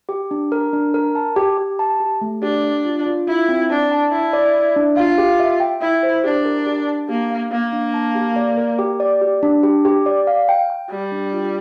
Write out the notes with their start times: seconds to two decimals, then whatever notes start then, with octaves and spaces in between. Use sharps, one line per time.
0.09 G4
0.31 D4
0.52 A#4
0.73 D4
0.94 A#4
1.15 A5
1.36 G4
1.58 G4
1.79 A5
2.00 G4
2.21 A3
2.43 D4 G4
2.64 D5
2.85 F4
3.06 F4
3.27 E4 F4
3.49 C4
3.70 D4 A5
3.92 A5
4.12 E4 D5
4.33 D5
4.55 D5
4.76 D4
4.97 F4 F5
5.18 G4
5.40 E5
5.60 G5
5.81 E4 E5
6.03 C5
6.24 D4 G4
6.45 A#4
6.67 G4
6.88 A5
7.09 A#3 G4
7.31 F5
7.51 A#3 F5
7.73 D4
7.94 A5
8.15 G4
8.36 D5
8.58 A#4
8.79 G4
9.00 D5
9.22 G4
9.43 D4
9.63 G4
9.85 G4
10.06 D5
10.27 F5
10.49 G5
10.70 G5
10.91 G3 G5
11.12 D4
11.33 F4